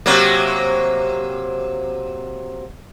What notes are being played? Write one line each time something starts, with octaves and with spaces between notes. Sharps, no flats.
C3 F#3 A#3